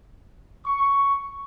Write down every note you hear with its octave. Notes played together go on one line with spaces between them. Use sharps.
C#6